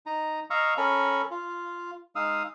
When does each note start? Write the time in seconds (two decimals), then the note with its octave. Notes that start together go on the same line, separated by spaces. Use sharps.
0.06 D#4 A#5
0.50 D#5 F5 A#5 C#6 E6
0.77 C#4 A4 A#4 B5 C#6
1.31 F4
2.16 G#3 D#4 F5 D#6 E6